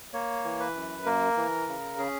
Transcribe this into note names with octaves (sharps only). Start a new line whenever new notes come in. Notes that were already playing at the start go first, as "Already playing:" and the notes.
A#3 C#5
E3
B4
F#2
A#3 A#4
E3
C#3
C#4 G#4